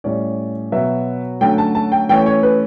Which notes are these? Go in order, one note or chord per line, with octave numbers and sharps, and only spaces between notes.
A2 G3 C#4 D5
B2 F#3 B3 E5
D3 F#3 A3 C#4 G5
A5
A5
G5
E3 A3 C#4 G5
C#5
B4